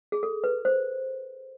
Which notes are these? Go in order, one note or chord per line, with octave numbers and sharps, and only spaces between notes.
G#4
A4
B4
C5